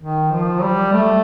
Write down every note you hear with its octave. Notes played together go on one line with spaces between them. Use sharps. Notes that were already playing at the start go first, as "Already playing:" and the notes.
D#3
F3
G3
A3